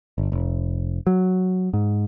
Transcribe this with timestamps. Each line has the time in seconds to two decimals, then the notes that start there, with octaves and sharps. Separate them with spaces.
0.18 G1
0.32 F1
1.07 F#3
1.74 G#2